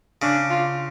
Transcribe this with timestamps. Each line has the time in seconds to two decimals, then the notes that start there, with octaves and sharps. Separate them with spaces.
0.22 C#3 D4
0.50 F4